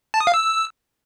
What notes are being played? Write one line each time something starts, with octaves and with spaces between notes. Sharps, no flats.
A5
D#6
F5
E6